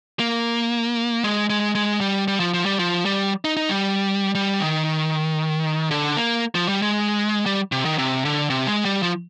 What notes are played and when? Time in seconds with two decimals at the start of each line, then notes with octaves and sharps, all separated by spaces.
0.19 A#3
1.24 G#3
1.50 G#3
1.75 G#3
2.01 G3
2.28 G3
2.40 F3
2.54 F3
2.65 G3
2.79 F3
3.05 G3
3.45 D#4
3.57 D#4
3.69 G3
4.35 G3
4.60 D#3
5.91 D3
6.16 A#3
6.55 F3
6.69 G3
6.82 G#3
7.46 G3
7.72 C3
7.85 D#3
7.98 C3
8.25 D3
8.50 C3
8.67 G#3
8.85 G3
9.03 F3